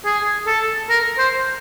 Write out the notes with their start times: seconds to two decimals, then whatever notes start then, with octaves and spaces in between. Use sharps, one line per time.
0.05 G#4
0.47 A4
0.90 A#4
1.18 C5